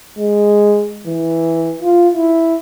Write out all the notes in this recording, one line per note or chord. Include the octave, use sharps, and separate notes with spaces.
G#3
E3
F4
E4